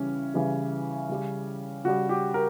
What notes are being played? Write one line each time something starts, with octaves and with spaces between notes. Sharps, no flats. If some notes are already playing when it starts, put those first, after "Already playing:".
Already playing: C#3 E3 G3 C#4
C#3 E3 G3
C#3 G3
C#3 G3 F#4
G4
A#4